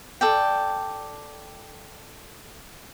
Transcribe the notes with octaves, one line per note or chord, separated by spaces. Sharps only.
A4 D5 G5